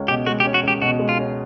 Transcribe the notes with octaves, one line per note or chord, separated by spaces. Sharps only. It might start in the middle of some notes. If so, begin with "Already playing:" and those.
Already playing: C#2 C#4
B2 G4
G#3 F#4
G4
C#4
F#4
C#2 G4
B2 F#4
G#3
F4
C#4